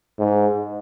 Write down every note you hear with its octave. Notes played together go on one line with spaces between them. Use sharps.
G#2